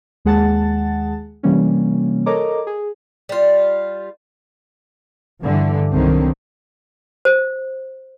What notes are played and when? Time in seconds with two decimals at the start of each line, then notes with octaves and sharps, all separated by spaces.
0.25 D#2 G#3 G#4 F#5 A5 A6
1.43 C3 E3 G3 A#3 C#4
2.26 A4 A#4 C#5 D#5 A#5 D6
2.67 G#4
3.29 G3 F4
5.41 G2 D3 E3
5.91 C2 D3 D#3 F#3 C4
7.25 C5